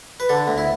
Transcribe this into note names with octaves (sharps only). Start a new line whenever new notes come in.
B4
D3 A4
D2
E4